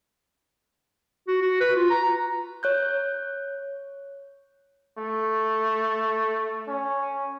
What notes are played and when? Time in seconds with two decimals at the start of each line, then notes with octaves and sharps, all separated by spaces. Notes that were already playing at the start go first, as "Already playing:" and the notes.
1.28 F#4
1.41 F#4
1.60 B4
1.76 F4
1.90 A#5
2.63 C#5 F#6 G6
4.98 A3
6.67 C#4